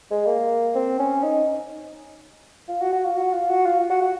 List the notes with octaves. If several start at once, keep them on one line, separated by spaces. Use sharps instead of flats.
G#3
A#3
C4
C#4
D#4
F4
F#4
F#4
F4
F#4
F4
F#4
F4
F#4
F#4